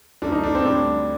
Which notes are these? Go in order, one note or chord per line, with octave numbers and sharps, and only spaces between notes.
F#2 D3 A3 D4
D#4
D4
C4
D2 D3 G3 D4